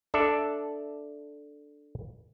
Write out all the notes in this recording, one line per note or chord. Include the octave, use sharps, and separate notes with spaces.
D4 A4 D5 E5